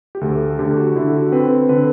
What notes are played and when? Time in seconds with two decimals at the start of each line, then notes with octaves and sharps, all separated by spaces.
0.15 G4
0.21 D2 A4
0.59 D3 G4
0.76 F#4
0.96 D3 E4
1.13 F#4
1.32 C4 B4
1.69 D3 B4